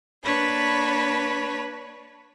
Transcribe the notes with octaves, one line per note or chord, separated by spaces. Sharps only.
A#3 D4 B4 C#5 A5 B5